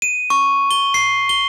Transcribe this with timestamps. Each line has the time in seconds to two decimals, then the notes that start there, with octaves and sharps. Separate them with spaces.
0.02 D#7
0.30 C#6
0.71 G7
0.94 C7
1.29 G7